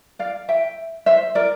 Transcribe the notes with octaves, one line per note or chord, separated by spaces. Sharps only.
D5 F5
E5 G5
C5 E5
A#4 D5